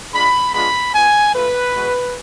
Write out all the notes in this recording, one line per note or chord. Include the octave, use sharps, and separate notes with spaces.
G#3 D4 F4 B5
G#3 B3 D4 F4 B5
B3 F4 G#5
A3 F4 B4
G#3 B3 F#4